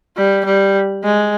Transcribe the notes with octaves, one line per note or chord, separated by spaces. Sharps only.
G3
G3
G#3